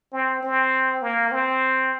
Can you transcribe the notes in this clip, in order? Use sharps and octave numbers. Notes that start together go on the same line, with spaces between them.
C4
C4
A#3
C4